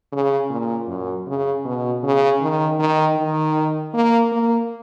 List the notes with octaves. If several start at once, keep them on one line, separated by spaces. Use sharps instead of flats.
C#3
A#2
F#2
C#3
B2
C#3
D#3
D#3
D#3
A#3
A#3